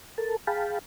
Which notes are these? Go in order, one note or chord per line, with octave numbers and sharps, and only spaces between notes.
A4 A#4 A5
G#4 F5 G5 A5 B5